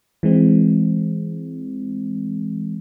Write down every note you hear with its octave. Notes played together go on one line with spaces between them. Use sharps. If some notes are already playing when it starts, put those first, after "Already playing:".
E3 G#3 C4